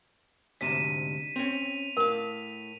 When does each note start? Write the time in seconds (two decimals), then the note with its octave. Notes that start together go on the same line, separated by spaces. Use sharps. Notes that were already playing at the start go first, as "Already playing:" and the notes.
0.61 D2 G#2 C3 B6 D#7 E7
1.36 C4 C#4 F7
1.97 A2 A#4 F5